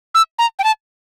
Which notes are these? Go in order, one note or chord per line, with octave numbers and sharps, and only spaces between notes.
E6
A#5
G5
A5